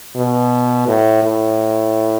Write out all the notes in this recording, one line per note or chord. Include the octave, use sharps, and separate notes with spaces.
B2
A2
A2